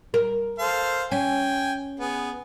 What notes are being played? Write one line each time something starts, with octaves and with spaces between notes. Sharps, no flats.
A#4
A4 C5 F5
C#4 G5 G#5
B3 G#4